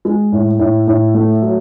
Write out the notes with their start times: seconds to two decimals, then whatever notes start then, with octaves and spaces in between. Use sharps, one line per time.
0.05 G#3
0.32 A2
0.59 A2
0.87 A2
1.14 A3
1.42 F#3